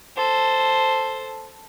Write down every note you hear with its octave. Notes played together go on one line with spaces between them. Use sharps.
A4 C5